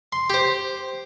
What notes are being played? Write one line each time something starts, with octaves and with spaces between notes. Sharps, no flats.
C6
G4 C5